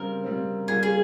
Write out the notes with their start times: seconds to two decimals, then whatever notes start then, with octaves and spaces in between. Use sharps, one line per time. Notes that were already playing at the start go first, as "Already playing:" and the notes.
Already playing: C#3 G3 C4 A#4
0.24 C#3 G3 C4
0.68 C#3 G3 A#3 C#4 F4 G#4
0.83 G#4